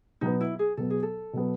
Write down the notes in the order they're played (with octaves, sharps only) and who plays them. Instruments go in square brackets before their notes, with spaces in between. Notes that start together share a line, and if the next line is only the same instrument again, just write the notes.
[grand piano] B2 F#3 B3 [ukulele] D#4
[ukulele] E4
G#4
[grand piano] B2 F#3 B3 [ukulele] A4
[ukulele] G#4
A4
[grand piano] B2 F#3 B3